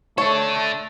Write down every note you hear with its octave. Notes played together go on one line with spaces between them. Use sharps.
A3 D4 A4 C#5